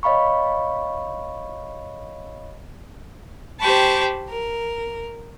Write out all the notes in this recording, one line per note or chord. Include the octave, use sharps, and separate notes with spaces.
C#5 D#5 F5 B5 C#6
G4 C5 G5 A5 B5 C#6
A#4